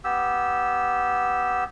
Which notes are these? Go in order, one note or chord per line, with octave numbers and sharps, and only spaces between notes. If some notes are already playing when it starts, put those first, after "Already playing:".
B3 G4 E6